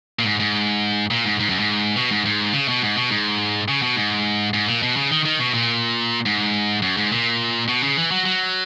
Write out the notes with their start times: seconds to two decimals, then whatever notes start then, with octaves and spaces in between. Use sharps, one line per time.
0.19 A#2
0.25 G#2
0.40 G#2
1.11 A#2
1.25 G#2
1.39 G#2
1.49 F#2
1.59 G#2
1.96 B2
2.11 G#2
2.25 G#2
2.54 C#3
2.68 B2
2.82 G#2
2.96 B2
3.10 G#2
3.68 C#3
3.82 B2
3.96 G#2
4.54 G#2
4.68 A#2
4.82 B2
4.96 C#3
5.11 D#3
5.25 D#3
5.40 B2
5.54 A#2
6.26 G#2
6.82 F#2
6.97 G#2
7.12 A#2
7.68 B2
7.83 C#3
7.97 E3
8.11 F#3
8.26 F#3